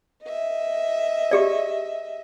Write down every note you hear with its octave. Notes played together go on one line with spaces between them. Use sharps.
D#5 E5
G4 G#4 D5